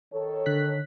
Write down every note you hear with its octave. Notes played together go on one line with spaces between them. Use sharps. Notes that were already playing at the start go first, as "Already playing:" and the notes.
D#3 A4 C#5
D3 F#6 B6